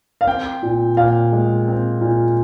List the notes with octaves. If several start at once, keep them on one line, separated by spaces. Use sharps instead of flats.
F5
C4 G5
A#2
A#2 F5
G#3
C4
A#2